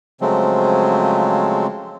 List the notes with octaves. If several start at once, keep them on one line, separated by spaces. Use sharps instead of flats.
C#3 F3 F#3 G#3 A3 C4